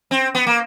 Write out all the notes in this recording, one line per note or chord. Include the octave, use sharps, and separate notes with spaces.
C4
B3
A#3